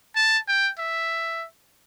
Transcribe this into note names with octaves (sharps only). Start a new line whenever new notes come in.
A5
G5
E5